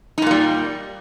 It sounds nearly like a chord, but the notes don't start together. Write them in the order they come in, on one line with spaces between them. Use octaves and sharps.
D#4 A#2 A#3 G3